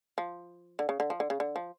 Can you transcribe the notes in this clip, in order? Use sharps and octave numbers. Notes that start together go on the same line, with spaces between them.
F3
D3
C#3
D3
F3
D3
C#3
D3
F3